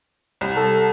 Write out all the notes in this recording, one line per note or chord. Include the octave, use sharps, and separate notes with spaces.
C2
A4